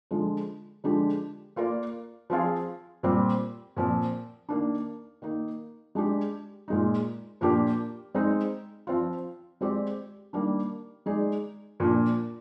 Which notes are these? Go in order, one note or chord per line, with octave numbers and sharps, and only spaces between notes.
D3 F3 G#3
D3 F3 G#3 D4 G4
A#3 F4 A#4 D5
F3 C4 F4 G#4
A#2 G3 C4
A#2 F3 C4
D#3 A#3 D4
D#3 A#3 D#4
G#3 D4 G4
A#2 G#3 D#4
A#2 F3 A#3 D4 G4
G#3 C4 D#4
F3 C4 F4
G#3 C4 G4 D5
D#3 G3 A#3 D4
G#3 D#4 G#4 D5
A#2 F3 A#3 D4